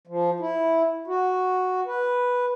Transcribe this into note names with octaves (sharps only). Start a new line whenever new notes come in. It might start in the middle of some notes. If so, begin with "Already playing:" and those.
F3
E4
F#4
B4